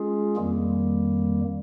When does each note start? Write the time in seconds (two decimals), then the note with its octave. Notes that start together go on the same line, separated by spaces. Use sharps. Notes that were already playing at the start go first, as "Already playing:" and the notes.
Already playing: G#3 C#4 F4 G#4
0.36 F2 D#3 G3 A#3